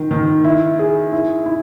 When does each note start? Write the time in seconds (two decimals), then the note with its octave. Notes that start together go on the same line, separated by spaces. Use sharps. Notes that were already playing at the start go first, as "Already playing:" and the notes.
Already playing: D#3
0.11 D#3
0.44 E4
0.79 G#4
1.12 E4
1.46 E4